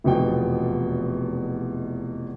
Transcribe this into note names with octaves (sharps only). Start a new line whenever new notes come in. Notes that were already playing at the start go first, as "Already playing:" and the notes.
F1 E2 B2 F3 G5